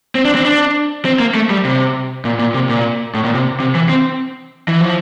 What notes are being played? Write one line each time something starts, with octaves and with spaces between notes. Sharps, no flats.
C4
D4
C4
D4
C4
A#3
A3
G3
C3
A#2
A#2
C3
A#2
A2
A#2
C3
C3
E3
C4
E3
F3